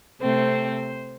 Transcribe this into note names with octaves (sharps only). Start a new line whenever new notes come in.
C3 A3 C4 C5